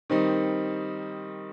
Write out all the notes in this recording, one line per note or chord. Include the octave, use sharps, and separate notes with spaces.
D#3 G3 C4 D#4